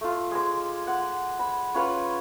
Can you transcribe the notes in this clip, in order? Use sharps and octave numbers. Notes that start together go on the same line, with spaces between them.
A3 F4
G#3 D6
F#5
B5
C#4 F4 B4 C#5